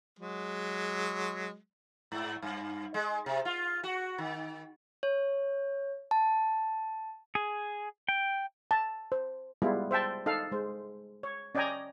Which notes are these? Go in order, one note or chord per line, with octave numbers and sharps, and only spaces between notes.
F#3 G#3
G#2
G2
G#3
C3
F4
F#4
D#3
C#5
A5
G#4
G5
A5
C5
G3 G#3 B3 E4 F4
C5 E5 G5 A5
D#4 A4 F5
G#3 C5
C#5
C#4 D5 D#5 G5 G#5 A#5